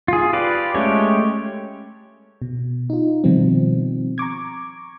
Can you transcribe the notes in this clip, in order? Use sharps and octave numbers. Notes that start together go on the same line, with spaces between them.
F4 G#4
F4 G4 B4 D5
G#3 A3 C#4 G4 C#5
B2
D#4 F4
B2 D#3 F3 G3 C4
A#5 C#6 D6 G#6